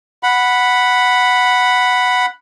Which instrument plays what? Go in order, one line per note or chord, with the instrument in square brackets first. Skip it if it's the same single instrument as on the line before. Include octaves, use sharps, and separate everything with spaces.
[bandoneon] F#5 B5